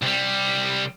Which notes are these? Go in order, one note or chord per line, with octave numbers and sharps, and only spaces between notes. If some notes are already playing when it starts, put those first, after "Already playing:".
C2 G3